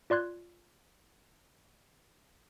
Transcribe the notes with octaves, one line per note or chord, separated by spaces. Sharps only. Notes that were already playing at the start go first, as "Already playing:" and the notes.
F4 D5 C6 F#6 G#6